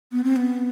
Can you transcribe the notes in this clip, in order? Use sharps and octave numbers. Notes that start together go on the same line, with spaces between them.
B3
C4
B3